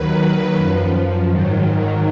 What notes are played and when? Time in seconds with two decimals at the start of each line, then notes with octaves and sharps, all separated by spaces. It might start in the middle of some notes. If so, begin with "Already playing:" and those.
Already playing: D#2 D#3 F#3 B4
0.55 F#2 F3
1.28 G#2 D#3 F#3